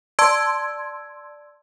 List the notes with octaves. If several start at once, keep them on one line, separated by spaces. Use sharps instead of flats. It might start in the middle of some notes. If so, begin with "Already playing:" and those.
D5 A5 C6 E6 G#6 D7